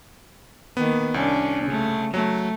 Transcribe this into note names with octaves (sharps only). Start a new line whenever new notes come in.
D#3 A#3 B3
C2 C#4 D4
C#3 A3
F#3 A3